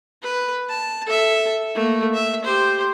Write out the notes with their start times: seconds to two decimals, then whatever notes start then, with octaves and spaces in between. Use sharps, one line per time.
0.23 B4
0.69 A5
1.06 A4 E5
1.75 A3 A#3
2.14 E5
2.44 G4 C5